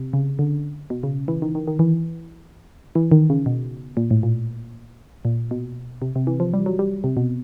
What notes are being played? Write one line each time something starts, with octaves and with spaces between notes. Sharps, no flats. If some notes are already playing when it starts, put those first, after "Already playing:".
Already playing: C3
C#3
D3
B2
C#3
E3
D#3
D#3
D#3
E3
E3
D#3
C#3
B2
A#2
A2
A#2
A#2
B2
C3
C3
E3
F3
G3
F#3
G3
C3
B2